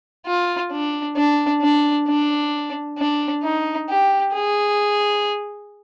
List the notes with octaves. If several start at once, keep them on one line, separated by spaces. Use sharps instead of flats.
F4
D4
D4
D4
D4
D4
D#4
G4
G#4